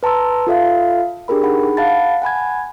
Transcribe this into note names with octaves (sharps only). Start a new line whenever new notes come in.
B4 A5 A#5 C6 E6
F4 A4 E5 F5
D4 G4 G#4 A#4 B5
D#4 G#4 F#5 B5
F5 F#5 A5 B5 A6
F#5 G#5 B5 G#6